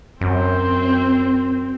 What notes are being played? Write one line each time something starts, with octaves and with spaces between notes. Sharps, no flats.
F#2 C4